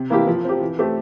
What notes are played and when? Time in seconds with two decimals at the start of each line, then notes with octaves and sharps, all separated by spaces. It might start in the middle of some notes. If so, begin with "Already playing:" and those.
Already playing: C3
0.10 E3 A#3 E4 G4
0.27 F3
0.44 C4 G4
0.61 E3
0.79 A3 C4 G4